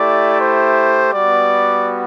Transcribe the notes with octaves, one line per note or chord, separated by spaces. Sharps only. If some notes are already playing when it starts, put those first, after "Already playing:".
Already playing: A3 E4 G4 D5
C5
G3 B3 F#4 D5